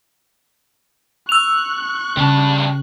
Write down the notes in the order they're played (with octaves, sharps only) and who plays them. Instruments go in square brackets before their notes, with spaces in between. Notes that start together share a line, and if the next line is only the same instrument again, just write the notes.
[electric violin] C#6 F#6 [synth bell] E6 F7
[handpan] C#3 [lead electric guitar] G3 A5